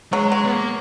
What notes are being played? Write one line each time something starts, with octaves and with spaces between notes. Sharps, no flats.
F#3 G#3
F#3
B3
A#3